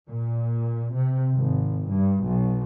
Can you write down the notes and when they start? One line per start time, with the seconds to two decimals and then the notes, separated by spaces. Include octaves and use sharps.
0.11 A#2
0.94 C3
1.34 G#1
1.89 G2
2.26 B1